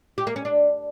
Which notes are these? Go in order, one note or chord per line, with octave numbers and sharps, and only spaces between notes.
G4
A#3
C#4
D4